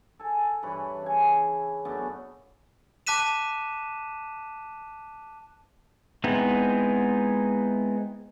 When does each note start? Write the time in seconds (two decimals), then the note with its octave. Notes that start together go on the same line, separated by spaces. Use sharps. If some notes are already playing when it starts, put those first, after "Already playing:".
0.19 A4 G#5
0.63 G2 E3 B4 C#5
1.02 C#3 G#5
1.85 F#2 A3 B3 D4
3.07 A5 D6 F#6 B6 D#7 E7
6.24 G#3 B3 C4 D#4 E4